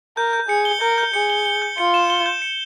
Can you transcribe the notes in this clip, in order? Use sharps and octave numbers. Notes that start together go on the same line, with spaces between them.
A#4 G6
G6
G#4 C#7
G7
A#4 G6
G6
G#4 C#7
G7
G7
G6
F4 C#7
E7
G7
G6
C#7